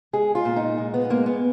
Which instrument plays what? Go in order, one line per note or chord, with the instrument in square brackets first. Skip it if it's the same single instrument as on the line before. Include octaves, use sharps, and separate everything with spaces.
[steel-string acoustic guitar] G#3 G#4
F4
A#2
D#4
G#3
B3
G#3 A#3
B3